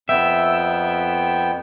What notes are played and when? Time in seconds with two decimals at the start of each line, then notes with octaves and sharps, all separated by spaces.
0.09 F2 B3 E5 G5